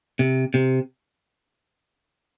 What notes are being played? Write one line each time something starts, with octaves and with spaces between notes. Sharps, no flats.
C3
C3